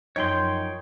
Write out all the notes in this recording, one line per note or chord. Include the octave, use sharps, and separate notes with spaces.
F#2 F3 D#4 C#5 G5 C6